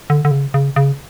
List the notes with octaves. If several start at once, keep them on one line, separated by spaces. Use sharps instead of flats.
D3
D3
C#3
C#3
C#3